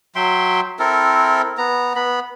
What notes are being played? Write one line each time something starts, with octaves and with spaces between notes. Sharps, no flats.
F#3 E5 G5 C6
C4 E4 A4 A#4
B3 A#5
B3 B5